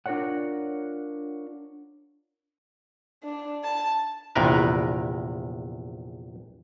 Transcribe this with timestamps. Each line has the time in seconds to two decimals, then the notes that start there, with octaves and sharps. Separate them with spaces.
0.06 D4 F4 A#4 C#5 D5 F#5
3.23 D4
3.64 A5
4.35 A#1 E2 C3 A#4 B4